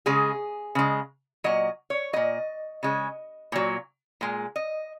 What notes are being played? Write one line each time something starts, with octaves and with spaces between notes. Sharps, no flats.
C#3 G#3 G#4
C#3 G#3
A#2 F#3 D#5
C#5
A#2 F#3 D#5
C#3 G#3
A#2 F#3
A#2 G#3
D#5